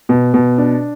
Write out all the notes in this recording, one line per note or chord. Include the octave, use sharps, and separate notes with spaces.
B2
B2
D4